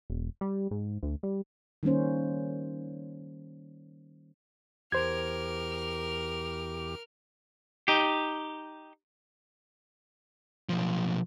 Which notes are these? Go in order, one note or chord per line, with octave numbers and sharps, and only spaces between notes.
E1
G3
G#2
D2
G3
D#3 G3 A#3 C#4 C5
E2 G4 A#4 C5 D6 F6 G#6
D#4 G4
B1 F3